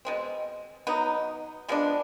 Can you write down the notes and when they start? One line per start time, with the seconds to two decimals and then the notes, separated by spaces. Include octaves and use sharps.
0.05 B2 G#3 C4
0.87 F#3 B3 D#4
1.68 F3 G#3 B3 D4